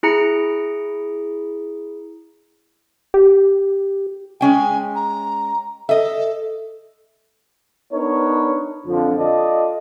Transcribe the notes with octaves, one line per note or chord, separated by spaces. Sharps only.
E4 G#4 A#5 C#7 D7
G4
G#3 C#4 G5 G#5
A#5
A4 D#5 E5
B3 D4 D#4 A#4 B4 C#5
F2 D3 F3
F4 A4 D5 D#5